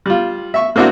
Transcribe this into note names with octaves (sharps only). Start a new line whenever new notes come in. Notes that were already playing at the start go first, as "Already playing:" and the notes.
G3 F4
E5 C#6
A#3 C4 D4 E4 F#4